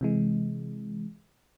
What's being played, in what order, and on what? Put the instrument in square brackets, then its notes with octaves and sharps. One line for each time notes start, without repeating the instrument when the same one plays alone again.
[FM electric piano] C3 E3 G#3